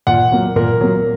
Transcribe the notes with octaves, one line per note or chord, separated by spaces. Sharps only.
A#2 F#5
F#3 A#3
A#2 A#4
F#3 A#3